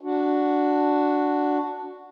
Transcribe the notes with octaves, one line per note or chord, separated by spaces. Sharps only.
D4 F#4